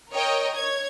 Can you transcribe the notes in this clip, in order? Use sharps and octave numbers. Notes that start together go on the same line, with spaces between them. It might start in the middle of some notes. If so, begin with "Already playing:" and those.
A#4 C#5 D#5 G5
C#5 G#6